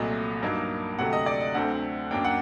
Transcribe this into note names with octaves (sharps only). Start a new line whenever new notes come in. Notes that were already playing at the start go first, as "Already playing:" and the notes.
Already playing: C2 A#2 F#3 A3 D#5
G2 F#3 A#3 D#4
D2 C3 F#3 A3 F#5
D#5
D5
D#5
D2 D3 F#3 A3 C4 F#5
F#2 F#3 A#3 D4 G5
F#5